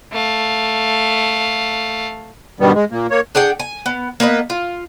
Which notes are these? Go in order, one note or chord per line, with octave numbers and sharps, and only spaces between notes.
A3 F5
G2 B2 D#3 G3 B3
G#3
A#2 A#3
A#3 C#5
D4 G#4 F#5 G5
G#5
B3
A#3 B3 B4 D#5
F4